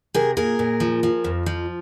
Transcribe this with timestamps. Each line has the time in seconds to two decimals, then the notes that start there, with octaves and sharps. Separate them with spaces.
0.14 C3 G#4 A#4
0.37 A#2 G#4 A#4
0.59 A#2
0.80 F3
1.03 F3
1.24 F2
1.46 F3